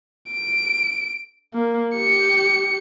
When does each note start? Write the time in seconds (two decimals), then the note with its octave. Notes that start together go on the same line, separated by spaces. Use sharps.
0.31 D7
1.54 A#3
1.95 G4 C#7